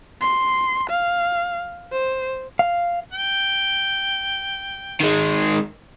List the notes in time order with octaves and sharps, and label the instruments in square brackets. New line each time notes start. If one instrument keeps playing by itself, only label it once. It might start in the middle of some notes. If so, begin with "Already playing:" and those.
[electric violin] C6
F5
C5
[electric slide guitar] F5
[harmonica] G5
[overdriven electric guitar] D#3 G#3